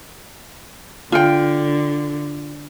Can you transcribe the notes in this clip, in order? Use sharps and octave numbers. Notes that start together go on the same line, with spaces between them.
D3 F4 G5